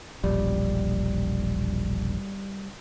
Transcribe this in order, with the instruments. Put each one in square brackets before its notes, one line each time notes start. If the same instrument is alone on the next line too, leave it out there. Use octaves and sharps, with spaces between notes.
[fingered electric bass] E1 A#1 [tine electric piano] G3